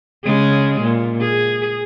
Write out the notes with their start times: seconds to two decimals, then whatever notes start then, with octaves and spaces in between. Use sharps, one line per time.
0.25 C#3 G#3 G#4
0.82 A#2
1.21 G#4